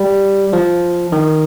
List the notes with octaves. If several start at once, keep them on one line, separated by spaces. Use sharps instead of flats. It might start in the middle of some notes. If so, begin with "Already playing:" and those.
Already playing: G3
F3
D#3